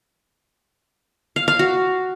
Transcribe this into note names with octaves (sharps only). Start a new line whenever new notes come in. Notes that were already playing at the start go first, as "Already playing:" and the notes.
F5
F5
F#4